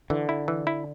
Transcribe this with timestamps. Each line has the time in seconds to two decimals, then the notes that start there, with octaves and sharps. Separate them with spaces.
0.10 D3 E3
0.29 E4
0.48 E3
0.67 E4